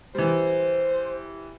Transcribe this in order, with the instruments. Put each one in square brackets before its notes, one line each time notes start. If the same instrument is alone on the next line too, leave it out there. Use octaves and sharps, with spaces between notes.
[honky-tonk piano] E3 G3 [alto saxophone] C5